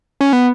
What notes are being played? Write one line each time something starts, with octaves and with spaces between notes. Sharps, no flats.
C#4
B3